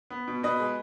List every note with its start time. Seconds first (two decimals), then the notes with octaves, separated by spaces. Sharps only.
0.10 B3
0.28 B2
0.43 B2 B4 D#5
0.60 G#3